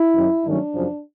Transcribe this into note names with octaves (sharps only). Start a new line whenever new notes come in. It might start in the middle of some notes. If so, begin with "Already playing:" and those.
Already playing: E4
F#2 D#3 F#3
G2 D#3 F#3 A3 C#4 D4
F#2 C#3 F3